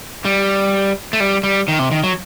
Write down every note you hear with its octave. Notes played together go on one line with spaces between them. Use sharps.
G3
A3
G3
G3
D#3
C3
D#3
F#3